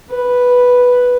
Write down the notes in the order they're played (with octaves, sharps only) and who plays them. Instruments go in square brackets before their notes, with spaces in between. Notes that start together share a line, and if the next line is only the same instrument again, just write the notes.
[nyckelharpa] B4